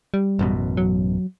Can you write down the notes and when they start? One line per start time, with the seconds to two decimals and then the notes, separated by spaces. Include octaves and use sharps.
0.14 G3
0.39 A1 F#2 B2
0.77 F#3